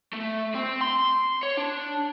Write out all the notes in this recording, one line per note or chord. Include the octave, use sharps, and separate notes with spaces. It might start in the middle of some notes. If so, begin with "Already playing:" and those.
A3
C4
C6
C#5
D4